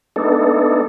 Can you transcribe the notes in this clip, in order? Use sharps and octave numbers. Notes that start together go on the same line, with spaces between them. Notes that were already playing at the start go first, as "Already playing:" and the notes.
A3 B3 D4 D#4 A4